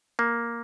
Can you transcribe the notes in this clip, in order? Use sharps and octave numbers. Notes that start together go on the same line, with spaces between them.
A#3